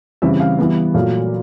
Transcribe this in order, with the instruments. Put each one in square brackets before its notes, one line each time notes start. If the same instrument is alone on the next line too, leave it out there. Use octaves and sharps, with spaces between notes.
[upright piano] C#3 E3 G3 C4 E5
F5
E3 G3 B3
A#2 F#3 A3 F5